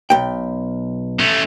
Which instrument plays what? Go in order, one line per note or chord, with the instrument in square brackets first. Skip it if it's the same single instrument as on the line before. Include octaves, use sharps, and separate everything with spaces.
[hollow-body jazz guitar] B1 G5
[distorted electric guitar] A3 C#4